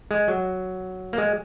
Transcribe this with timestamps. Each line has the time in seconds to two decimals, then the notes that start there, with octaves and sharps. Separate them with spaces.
0.11 G#3
0.28 F#3
1.13 A#3
1.18 G#3